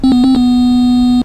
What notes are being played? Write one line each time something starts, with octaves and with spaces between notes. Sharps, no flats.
C4
B3
C4
B3